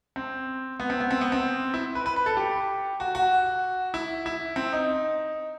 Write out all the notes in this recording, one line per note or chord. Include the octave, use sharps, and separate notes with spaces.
C4
B3
C4
B3
C4
B3
C4
E4
B4
B4
B4
A4
G4
F#4
F#4
E4
E4
C4
D#4